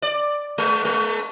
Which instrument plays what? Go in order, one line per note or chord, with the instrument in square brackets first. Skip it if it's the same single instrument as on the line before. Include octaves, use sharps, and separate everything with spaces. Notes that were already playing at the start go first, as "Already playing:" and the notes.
[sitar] D5
G#3
G#3